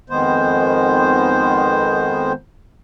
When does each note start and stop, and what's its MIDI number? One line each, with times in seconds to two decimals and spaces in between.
0.10 2.32 41
0.10 2.32 51
0.10 2.32 56
0.10 2.32 59
0.10 2.32 72